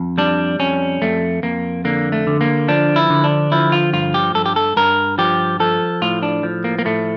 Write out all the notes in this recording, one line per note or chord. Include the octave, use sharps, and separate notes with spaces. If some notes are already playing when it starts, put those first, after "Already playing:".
Already playing: F2
G3 D4
F2 C#4
F2 A3
F2 A#3
D3 A#3
A3
D3
A#3
F3 D4
E4
D3
D4
F3 E4
F4
G2 F4
G4
G2 A4
G4
A4
G2 A#4
F3 G4
F3 A4
A2 F4
D4
F3
A#3
A#3
A2 A3